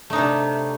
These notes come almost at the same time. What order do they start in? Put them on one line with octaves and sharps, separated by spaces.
A3 D#4 D4 C3